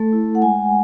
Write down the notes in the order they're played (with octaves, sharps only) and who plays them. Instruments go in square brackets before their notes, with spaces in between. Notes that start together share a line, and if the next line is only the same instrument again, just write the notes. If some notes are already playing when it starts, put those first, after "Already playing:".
Already playing: [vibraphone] A3 A4
E4
F#5
G#3 G#5